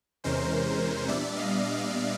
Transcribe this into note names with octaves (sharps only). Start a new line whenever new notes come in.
E2 C3 E3 G#3 C#4 A#4 C5
A#2 G3 B3 D4 D5 E5
D#5 F5
D#5 F5